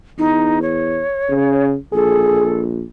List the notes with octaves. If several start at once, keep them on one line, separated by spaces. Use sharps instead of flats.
E2 D#4
C#5
C#3
A#1 G#4 A4